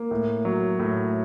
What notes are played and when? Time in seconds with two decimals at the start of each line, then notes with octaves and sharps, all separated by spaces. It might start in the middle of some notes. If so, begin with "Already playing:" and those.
Already playing: A#3
0.11 A2
0.45 F#3
0.80 A2